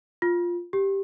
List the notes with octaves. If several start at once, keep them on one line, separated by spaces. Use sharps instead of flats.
F4
G4